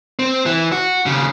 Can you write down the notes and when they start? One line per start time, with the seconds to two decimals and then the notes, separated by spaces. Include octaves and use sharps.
0.19 C4
0.46 E3
0.72 F#4
1.06 D#2 C#3